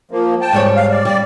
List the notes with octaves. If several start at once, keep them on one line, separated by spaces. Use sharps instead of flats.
F3 A#3
G5 A5
G#2 G3 C#5
F5
D5
G3 D5